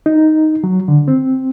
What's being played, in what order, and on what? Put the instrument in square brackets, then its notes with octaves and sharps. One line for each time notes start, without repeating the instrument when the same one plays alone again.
[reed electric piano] D#4
F#3
D3
C4